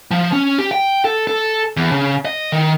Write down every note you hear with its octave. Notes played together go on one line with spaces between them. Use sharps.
F3
C#4
G4
G5
A4
A4
E2
C#3
D#5
D#3